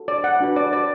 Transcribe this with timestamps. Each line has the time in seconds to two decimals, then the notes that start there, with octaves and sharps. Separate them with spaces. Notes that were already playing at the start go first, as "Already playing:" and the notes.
Already playing: F#4 A4
0.08 D5
0.24 F#5
0.40 D4 F#4 B4
0.56 D5
0.73 D5